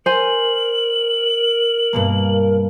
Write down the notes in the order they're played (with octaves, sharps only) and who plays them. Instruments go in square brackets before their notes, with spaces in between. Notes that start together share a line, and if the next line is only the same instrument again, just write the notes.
[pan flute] A#4 [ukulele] C5 G#5 [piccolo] F#7
[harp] G2 B2 A#3